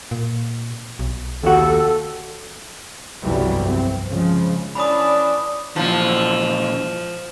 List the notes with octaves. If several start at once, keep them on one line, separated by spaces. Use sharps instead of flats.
A#2
B1
D#2 F#4 A4
G1 C2 F2 E3 F#3 G3
C4
C#3 F3 G#3
E3 C#4 D4 D5 B5 D#6
A#2 E3 F3